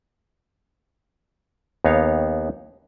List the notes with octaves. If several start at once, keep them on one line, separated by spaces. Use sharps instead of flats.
D#2 B3 D#4 C#5 F5